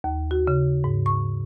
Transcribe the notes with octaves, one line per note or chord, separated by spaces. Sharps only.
D#2
F#4
C#3
G#2
C#6